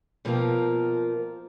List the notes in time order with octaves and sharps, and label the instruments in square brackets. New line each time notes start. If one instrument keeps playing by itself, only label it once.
[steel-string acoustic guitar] B2 F3 A#3 C4 F4 A#4